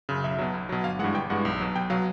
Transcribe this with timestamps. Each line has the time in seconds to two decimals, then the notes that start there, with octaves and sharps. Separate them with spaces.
0.09 F#2 C#3
0.24 B1 E5
0.38 B2 F#3
0.54 B1
0.69 B2 F#3
0.84 G1 F5
0.99 G2 E3 G#3 F#5
1.14 G1 G5
1.30 G2 E3 G#3 F#5
1.45 B1
1.60 B2 F#3
1.75 B1 G5
1.90 B2 F#3 F5